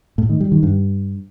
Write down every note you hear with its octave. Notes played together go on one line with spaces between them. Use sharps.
A2
D#3
G3
D#3
G2